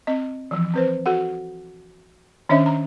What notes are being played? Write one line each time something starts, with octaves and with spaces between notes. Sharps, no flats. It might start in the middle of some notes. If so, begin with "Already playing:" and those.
C4 D#5
E3 F3
C4 B4 C5
F#4 A4 F#5
D#3 C#4 D4 C#5 D#5 E5
A#5